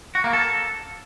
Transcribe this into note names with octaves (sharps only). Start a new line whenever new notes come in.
F#4
A#3
A4